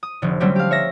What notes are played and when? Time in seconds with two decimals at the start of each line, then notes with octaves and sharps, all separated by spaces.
0.03 D#6
0.22 F1 D3
0.40 D3 F#3 G3 A3 C4 C#4
0.56 G4 F5
0.71 C#5 E5 A#6